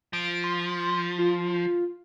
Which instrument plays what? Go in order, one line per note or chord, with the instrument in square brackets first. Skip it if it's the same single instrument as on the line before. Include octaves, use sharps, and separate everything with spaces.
[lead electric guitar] F3 [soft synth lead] D7
[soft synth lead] C6
F4